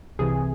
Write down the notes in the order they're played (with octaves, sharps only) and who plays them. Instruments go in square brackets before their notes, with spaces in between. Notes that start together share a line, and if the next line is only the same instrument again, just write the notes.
[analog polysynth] C2 C3 E3 G#4